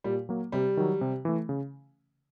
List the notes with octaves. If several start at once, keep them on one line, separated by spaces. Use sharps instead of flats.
A#2 G3
F#3 A#3
C3 G3
D#3 F#3
C3
E3 A3
C#3